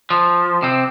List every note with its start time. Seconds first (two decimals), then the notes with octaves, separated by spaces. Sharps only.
0.10 F3
0.62 C3 C4